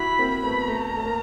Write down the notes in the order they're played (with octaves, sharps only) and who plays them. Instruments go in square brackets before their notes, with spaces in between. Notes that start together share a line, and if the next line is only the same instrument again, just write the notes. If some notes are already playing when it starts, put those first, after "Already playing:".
Already playing: [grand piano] E4 F#4 [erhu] B5
[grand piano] A#3 C4
[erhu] B5
[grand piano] A3 B3
[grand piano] A3 [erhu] A#5
[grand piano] A3
A#3